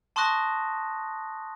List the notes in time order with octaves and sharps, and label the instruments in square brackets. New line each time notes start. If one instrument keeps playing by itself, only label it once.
[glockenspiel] A5 C6 C#6 D#6 F#6 A#6